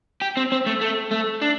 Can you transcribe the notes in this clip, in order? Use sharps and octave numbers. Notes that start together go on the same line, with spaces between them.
G4
C4
C4
A3
A3
A3
D4